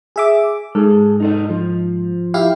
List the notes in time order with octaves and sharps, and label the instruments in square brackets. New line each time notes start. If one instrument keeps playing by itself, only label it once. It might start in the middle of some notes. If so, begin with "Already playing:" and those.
[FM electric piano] G#4 E5 D6
[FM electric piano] G#2 [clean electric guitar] G#4 A4
[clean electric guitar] D#4 A4 D#5
F3 F4
[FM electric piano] E4 G4 F5